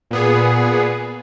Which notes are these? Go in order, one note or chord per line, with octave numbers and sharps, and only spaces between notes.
A#2 B3 G#4